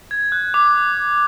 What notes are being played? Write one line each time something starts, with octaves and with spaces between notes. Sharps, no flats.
G#6
F#6
D6